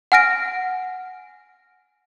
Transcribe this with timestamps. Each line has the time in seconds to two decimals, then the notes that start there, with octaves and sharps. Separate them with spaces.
0.12 F#5 G#5 F6 A#6 D7